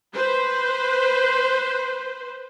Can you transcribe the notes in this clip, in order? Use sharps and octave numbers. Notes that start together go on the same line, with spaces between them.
B4 C5